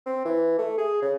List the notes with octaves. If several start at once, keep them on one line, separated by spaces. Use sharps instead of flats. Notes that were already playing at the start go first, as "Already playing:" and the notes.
C4
E3
A3
G#4
C#3